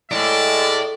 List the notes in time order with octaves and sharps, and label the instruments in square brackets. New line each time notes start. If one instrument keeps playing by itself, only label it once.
[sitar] A2 [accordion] G#3 [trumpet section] A#4 E5 A5 [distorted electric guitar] D5